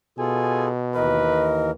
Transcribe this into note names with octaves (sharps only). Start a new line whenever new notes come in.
B2 F4 G#4 A4 G#5
D#2 E3 A#4 B4 D#5